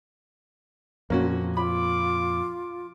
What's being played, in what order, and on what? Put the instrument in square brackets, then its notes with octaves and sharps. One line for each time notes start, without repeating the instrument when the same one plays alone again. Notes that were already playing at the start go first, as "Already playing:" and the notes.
[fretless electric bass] F2 A#2 [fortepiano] A#3 C#4 F#4
[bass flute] F4 [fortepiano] B5 [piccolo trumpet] D6